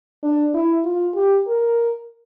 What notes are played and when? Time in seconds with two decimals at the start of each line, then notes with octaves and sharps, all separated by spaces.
0.23 D4
0.54 E4
0.85 F4
1.15 G4
1.48 A#4